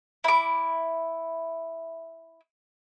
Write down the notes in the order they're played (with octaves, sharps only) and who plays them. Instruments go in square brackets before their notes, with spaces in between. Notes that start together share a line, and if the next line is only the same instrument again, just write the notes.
[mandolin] E4 D6